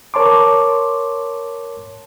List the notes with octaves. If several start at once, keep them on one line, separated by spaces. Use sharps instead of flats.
A#4 C#5 A5 C6 D6